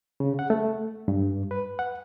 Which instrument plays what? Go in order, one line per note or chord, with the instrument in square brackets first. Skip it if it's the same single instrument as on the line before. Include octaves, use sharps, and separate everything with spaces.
[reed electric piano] C#3
F#5
A3
G2
B4
F#5